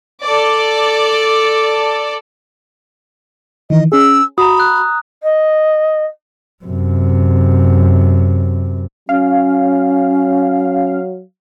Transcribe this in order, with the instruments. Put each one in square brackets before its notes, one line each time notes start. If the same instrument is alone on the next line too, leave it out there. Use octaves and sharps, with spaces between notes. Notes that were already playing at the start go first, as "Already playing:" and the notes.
[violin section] A4 D5
[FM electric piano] D#3 E3 [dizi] D#5
[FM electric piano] C#4 G#4 [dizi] E6
[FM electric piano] F#4 [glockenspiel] A#5 D#6 [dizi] B5
[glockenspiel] F#6
[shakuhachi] D#5
[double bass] F#2 C3
[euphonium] F#3 [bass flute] C#4 [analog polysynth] F5